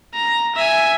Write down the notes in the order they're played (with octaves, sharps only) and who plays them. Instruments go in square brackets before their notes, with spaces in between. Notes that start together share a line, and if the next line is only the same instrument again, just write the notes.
[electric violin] A#5
E5 G#5